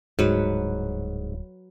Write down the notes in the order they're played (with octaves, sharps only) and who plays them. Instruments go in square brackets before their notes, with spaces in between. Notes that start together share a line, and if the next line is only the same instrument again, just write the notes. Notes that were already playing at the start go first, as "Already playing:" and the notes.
[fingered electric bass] D1 G3 [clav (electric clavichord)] G#2 [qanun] F#3 B4